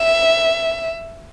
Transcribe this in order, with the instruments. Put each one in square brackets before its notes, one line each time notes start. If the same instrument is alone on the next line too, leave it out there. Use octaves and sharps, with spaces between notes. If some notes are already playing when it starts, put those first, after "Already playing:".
Already playing: [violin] E5